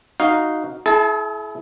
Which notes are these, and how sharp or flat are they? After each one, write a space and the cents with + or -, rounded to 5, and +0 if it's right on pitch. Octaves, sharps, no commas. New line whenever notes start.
D#4 +0 F#4 +0 F5 +0
E4 +0 G#4 +45 A5 -10